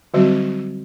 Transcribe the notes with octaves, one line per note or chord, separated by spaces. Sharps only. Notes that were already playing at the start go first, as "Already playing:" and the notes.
D3 F#3 G3 C4 F#4